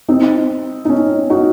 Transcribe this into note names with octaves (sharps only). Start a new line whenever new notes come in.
C4 D#4
D#4
C#4
D#4 F#4